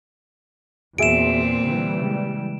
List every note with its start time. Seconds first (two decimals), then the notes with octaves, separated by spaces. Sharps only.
0.98 E2 A#2 C4 F#4 G#4 E5 D7 E7
1.65 D3 E3 G3
2.00 C#3 G#3